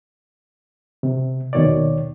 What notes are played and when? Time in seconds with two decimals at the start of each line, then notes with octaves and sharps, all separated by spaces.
1.03 C3
1.53 D#2 B2 D#3 D#4 C#5 D5